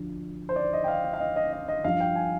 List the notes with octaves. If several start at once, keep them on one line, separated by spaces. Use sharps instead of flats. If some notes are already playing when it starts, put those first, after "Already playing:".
Already playing: D2 D3 F3
C5
D5
D#5
G5
F5
G5
F5
D#5
D#5
D#5
D#5
G2 F3 F5
G5
G#5